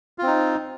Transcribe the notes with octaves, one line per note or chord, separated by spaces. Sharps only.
C4 D#4 F4